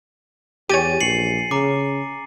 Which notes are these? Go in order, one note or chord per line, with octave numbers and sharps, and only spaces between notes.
E2 G4 C#5 G#5 A6 D#7
A#1 C7 C#7 F#7
C#3 A#5 D6